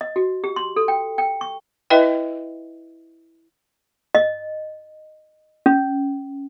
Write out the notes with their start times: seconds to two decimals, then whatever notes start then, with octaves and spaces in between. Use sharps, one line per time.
0.01 D#5
0.16 F#4
0.44 G4
0.56 C6
0.76 A4
0.88 G5
1.18 G5
1.41 C#6
1.90 E4 B4 D#5 E5 G5
4.15 D#5
5.66 C#4